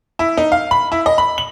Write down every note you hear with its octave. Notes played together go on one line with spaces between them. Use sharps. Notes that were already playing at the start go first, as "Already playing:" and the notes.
E4
D#4
F5
B5
E4
D#5
B5
F#7